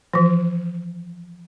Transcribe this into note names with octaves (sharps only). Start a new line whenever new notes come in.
E3 F3